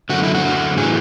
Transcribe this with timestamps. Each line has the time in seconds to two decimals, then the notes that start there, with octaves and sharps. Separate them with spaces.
0.09 F#2 D3 F#4
0.23 E4
0.35 F#4
0.43 F#2 D3
0.77 A2 E3 G#4